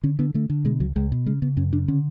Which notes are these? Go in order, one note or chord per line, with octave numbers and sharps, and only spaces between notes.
D3 C#4
D3 B3
D3 A3
D3
B2 G#3
C#2 F#3
C#2 G#3
B2
C#3 G#3
C#3 B3
F#2 C#4
C#3 D4
D3 C#4